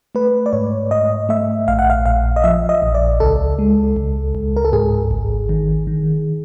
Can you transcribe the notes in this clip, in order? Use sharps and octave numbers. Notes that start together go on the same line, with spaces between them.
A3 B4
D5
G#2 C#5
G#2 D#5
A3 E5
A#1 F5
F#5
F5
A#1 F5
D#5
F3 E5
D#5
A#1
D5
C#2 A4
G#3
C#2
C#2
A#4
A4
G#2 G#4
G#1
D#3
D#3